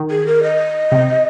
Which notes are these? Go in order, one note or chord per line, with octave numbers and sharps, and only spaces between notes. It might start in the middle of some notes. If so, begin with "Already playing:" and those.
Already playing: D#3
G#4
A#4
D#5
C3